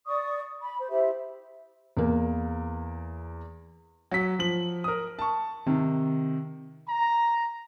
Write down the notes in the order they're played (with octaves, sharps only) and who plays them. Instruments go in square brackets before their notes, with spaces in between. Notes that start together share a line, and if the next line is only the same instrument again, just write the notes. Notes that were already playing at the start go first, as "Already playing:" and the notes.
[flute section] D5 C#6 D#6
B5
C5
E4 G4 C5 E5
[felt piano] E2 A#3
[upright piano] F#3 B6
F3 F#7
A#4 D#6
A5 C#6
C3 D#3
[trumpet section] A#5